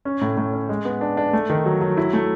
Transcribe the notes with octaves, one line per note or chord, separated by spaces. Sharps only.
C#4
A2
A2
C#4
G#3
B3
D4
D4
A3
D#3
F#3
F#3
E4
A3